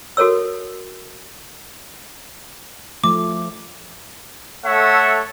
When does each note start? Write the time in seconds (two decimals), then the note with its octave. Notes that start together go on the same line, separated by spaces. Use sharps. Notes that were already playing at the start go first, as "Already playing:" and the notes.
0.17 F#4 A4 A#4 C#5 E6
3.04 F3 A3 D6
4.64 A3 A4 C#5 E5 F#5